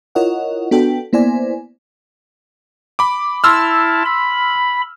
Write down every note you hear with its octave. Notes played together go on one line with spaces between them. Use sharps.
E4 F4 A#4 C#5 D#5 F#5
B3 D4 F#4 A4 G5
A#3 B3 E4 C5 D5 G#5
B5 D6
E4 A5 C6 E6 F6
B5